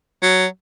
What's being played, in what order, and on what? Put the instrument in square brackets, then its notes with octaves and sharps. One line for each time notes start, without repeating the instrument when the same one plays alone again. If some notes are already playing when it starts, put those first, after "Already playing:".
[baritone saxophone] F#3